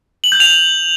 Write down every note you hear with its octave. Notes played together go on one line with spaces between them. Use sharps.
F#7
G6
F7